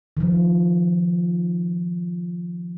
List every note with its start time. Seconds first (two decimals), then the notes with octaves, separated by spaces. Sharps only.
0.17 D#3 F3